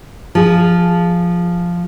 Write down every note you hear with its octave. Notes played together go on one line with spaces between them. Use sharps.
F3 G#4